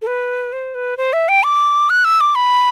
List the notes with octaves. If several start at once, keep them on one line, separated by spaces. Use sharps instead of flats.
A4
B4
C5
B4
C5
E5
G5
D6
F#6
E6
D6
B5